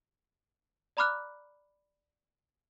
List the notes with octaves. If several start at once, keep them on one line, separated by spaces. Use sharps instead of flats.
D5 A#5 B5 D6 F6 F#6